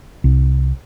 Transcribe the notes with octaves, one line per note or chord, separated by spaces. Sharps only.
C2